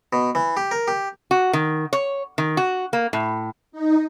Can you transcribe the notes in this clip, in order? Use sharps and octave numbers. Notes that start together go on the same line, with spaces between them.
B2
E3
G4
A#4
G4
F#4
D#3
C#5
D#3
F#4
A#3
A2
D#4